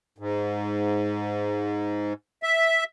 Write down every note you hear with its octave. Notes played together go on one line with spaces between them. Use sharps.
G#2
E5